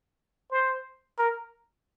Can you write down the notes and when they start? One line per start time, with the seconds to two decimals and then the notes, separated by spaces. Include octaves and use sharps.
0.51 C5
1.19 A#4